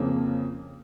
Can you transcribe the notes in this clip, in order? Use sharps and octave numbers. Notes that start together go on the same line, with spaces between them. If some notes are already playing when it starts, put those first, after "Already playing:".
Already playing: F2 C#3 F3 A#3